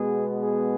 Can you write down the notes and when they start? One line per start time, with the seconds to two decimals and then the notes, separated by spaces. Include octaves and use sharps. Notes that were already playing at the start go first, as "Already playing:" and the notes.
Already playing: B2 G#3 B3 G#4
0.42 G#4